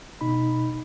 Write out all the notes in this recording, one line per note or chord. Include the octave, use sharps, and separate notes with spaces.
B2 D#4 B5